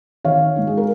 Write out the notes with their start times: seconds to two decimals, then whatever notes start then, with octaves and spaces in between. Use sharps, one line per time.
0.24 D#3 C#5 F5
0.56 G#3 D#4
0.67 G#4
0.77 A#4